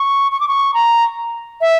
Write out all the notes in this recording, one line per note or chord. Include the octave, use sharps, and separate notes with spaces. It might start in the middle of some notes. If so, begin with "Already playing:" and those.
Already playing: C#6
C#6
D6
C#6
A#5
E5